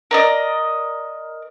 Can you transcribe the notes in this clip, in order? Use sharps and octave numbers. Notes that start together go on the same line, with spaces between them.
A#4 D5 D#5